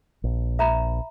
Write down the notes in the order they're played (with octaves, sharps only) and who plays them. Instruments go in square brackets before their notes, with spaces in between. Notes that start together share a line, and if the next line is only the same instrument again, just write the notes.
[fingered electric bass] A#1
[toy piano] E5 A#5 B5